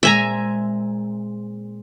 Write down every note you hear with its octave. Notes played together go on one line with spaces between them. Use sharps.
A#2 G#3 C4 E5 G#5 A#5